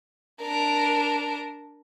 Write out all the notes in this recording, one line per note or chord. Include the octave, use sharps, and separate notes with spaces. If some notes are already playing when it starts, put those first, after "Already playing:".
D4 A#4